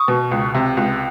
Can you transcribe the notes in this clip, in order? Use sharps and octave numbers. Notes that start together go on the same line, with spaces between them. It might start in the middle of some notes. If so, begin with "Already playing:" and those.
Already playing: C#6 D#6
B2
C#2
C3
C#2